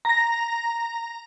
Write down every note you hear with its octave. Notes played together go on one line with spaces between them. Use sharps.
A#5 A#6